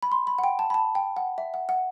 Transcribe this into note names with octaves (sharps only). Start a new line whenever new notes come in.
B5
C6
B5
F#5
G5
A5
B5
A5
G5
F#5
E5
F#5
F#5